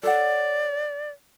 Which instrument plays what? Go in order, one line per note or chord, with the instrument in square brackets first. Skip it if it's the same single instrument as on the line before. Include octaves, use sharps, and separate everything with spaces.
[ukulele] A4 C#5 F#5 [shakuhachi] D5